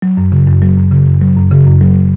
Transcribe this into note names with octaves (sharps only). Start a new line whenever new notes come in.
F#3
F#2
C#3
F#2
F#3
F#2
C#3
F#2
F#3
F#2
C#3
F#2
F#3